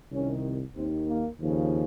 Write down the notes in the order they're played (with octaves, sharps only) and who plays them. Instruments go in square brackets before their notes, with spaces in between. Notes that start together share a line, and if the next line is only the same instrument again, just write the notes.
[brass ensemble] C2 C3 D#3 C#4
D#2 D#3 C4
A#3
D#2 C#3 F3